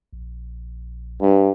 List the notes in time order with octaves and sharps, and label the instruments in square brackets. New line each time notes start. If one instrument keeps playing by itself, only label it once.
[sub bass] A#1
[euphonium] G2